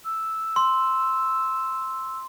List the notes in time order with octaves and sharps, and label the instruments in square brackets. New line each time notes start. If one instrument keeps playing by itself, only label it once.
[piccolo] E6
[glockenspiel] C6